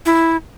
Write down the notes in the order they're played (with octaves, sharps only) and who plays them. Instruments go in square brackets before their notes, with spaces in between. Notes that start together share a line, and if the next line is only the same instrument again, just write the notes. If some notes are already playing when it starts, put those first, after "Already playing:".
[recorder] E4